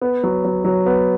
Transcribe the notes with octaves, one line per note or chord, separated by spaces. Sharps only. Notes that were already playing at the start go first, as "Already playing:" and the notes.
B3
F#3
F#3
F#3
B3